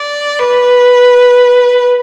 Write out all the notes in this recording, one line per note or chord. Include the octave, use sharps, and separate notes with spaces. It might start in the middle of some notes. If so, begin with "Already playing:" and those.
Already playing: D5
B4